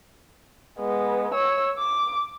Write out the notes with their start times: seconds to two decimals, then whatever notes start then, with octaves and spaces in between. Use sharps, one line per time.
0.79 G#3 B3
1.34 C#5 E6
1.78 D6